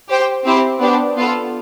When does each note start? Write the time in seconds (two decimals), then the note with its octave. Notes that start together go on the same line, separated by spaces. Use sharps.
0.08 G4 C5 G5
0.44 C4 E4 G4 C5
0.80 B3 D4 G4 C5
1.16 B3 F4 A4